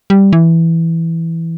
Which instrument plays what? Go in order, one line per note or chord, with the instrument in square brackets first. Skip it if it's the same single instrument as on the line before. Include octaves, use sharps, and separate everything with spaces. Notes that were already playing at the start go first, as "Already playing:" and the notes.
[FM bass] G3
E3